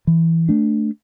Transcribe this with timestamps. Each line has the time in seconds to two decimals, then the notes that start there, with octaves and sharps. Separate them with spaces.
0.07 E3
0.49 A3 D4